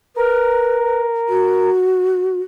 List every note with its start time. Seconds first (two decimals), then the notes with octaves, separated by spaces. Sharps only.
0.16 A#4 B4
1.29 F#4